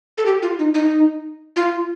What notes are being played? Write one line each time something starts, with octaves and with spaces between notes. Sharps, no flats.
A4
G4
F4
D#4
D#4
F4